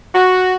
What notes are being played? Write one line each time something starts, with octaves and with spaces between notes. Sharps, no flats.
F#4